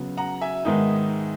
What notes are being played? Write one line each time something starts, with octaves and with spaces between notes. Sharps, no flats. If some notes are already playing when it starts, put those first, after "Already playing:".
Already playing: C#3 F#3 B3
F#5 A#5
E5 G#5
G#2 D#3 G#3 B3 D#4